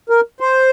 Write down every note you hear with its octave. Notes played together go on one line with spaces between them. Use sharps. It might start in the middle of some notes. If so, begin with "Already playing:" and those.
A#4
C5